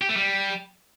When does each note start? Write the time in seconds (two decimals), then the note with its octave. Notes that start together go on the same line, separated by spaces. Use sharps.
0.02 G4
0.09 A3
0.17 G3